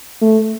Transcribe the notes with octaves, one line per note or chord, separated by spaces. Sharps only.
A3